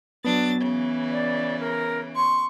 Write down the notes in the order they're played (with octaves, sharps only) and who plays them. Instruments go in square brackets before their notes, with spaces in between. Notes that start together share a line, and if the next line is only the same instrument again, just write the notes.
[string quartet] F#3 D4 A6 [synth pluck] B3
[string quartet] C#3 E3
[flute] D5
A#4
[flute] C6 [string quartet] C#6